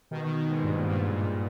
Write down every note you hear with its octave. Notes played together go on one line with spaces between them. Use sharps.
B2 D#3
B2 D#3
B2 D#3
G#2 B2
G2 A#2
G#2
G2 A#2
G#2
G2 A#2